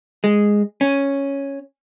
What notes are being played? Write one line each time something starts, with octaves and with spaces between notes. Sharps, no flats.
G#3
C#4